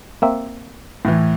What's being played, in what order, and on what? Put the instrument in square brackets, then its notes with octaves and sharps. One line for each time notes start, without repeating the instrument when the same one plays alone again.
[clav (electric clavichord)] A#3 C4 E5
[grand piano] A2 E3